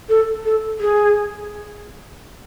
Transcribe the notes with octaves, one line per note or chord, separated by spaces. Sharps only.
A4
A4
G#4